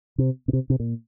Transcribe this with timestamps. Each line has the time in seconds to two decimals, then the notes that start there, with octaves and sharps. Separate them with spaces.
0.18 C3
0.48 B2
0.53 C3
0.70 C3
0.80 A#2